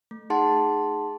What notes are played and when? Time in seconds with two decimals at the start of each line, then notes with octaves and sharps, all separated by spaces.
0.11 A3
0.30 D#4 G#4 F#5 A5 C6